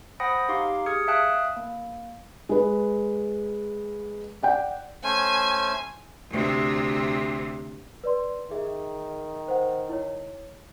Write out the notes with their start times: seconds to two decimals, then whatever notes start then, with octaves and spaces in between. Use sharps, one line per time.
0.20 C5 F#5 G5 B5 D#6 A#6
0.49 D#4 G4 F5 C6 D6
0.65 G4
0.86 G#4 D#6 F6 G#6 C#7
1.08 E5 F5 G5 A5 D#6 F#6
1.57 A#3
2.49 G#3 B4
4.43 D5 F#5 G5
5.04 A3 C#4 C5 G#5
6.30 D2 C3
8.04 B4 D5 C6
8.51 D#3 G#4 E5
9.48 C5 F#5
9.89 E4 C#5